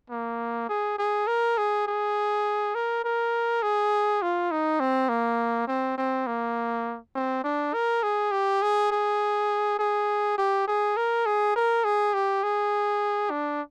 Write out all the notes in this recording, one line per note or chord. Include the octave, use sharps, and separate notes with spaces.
A#3
G#4
G#4
A#4
G#4
G#4
A#4
A#4
G#4
F4
D#4
C4
A#3
C4
C4
A#3
C4
D4
A#4
G#4
G4
G#4
G#4
G#4
G4
G#4
A#4
G#4
A#4
G#4
G4
G#4
D4